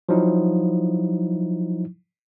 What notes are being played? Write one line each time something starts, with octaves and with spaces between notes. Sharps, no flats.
F3 F#3 D#4 E4